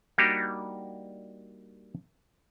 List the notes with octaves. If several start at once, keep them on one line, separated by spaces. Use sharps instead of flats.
G3 A#3 D4 D#4 F#4 G4